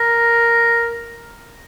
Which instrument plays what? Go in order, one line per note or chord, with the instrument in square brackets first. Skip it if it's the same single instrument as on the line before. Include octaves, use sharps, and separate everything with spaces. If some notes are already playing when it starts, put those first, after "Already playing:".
Already playing: [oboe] A#4